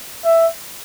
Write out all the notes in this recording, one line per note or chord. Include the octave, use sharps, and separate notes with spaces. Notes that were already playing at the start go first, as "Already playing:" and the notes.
E5